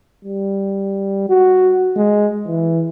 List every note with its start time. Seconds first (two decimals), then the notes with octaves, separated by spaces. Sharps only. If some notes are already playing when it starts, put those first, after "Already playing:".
0.25 G3
1.29 F#4
1.96 G#3
2.47 E3